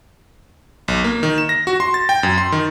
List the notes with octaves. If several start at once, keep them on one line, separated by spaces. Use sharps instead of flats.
B1
A#3
D#3
E7
A#6
F#4
C6
A6
G5
F#2
C6
D#3